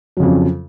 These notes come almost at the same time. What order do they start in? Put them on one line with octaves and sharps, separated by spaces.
F#3 C#3 F2